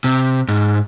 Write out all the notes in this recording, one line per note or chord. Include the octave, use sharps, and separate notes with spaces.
C3
G#2